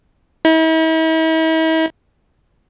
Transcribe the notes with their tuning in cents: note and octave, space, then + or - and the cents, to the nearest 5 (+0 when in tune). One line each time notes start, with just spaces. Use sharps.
E4 -45